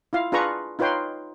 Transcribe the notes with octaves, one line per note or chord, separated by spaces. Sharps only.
E4 F4 F5
D4 F4 G#4 B4 A#5 C#6
D#4 F4 B4 C#5 G5 C6